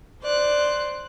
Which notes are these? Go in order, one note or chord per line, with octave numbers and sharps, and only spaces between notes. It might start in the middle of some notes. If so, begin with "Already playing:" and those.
C5 D5 F#6